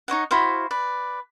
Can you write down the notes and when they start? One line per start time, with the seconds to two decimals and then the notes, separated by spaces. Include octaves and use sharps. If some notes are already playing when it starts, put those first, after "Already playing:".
0.08 D#4 C#5 D#5 F#5
0.31 E4 F#4 C5 F5
0.71 B4 D5